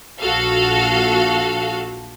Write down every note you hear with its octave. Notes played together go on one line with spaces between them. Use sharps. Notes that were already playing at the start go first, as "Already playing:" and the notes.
A#1 F#4 A4 F5